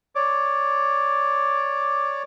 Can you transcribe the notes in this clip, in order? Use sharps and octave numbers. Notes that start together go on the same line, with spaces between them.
C#5 D5 D6